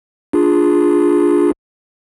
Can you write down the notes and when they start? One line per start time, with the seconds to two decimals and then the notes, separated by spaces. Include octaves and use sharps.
0.33 D4 F4 G#4